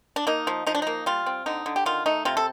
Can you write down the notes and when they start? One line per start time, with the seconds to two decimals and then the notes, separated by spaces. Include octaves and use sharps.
0.16 D4
0.27 A#3 D#4
0.47 F3
0.67 F3 D#4
0.75 D4
0.82 A#3 D#4
1.06 G3 F4
1.26 C4
1.46 D3 D#4
1.66 D3
1.76 G4
1.86 D#3 F4
2.06 A3 D#4
2.25 C3 F4
2.37 A4